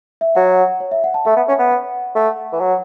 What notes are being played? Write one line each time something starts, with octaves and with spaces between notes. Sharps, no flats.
E5
F#3 F#5
C#5
E5
F#5
A5
A3 E5
B3
C#4
B3
F#5
A3 F#5
E3
F#3